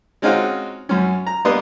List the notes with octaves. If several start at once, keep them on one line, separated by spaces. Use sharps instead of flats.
G#3 C4 C#4 D#4 F4 F#4
F#2 C#4
A#5
G3 A#3 B3 D4 B4 D#5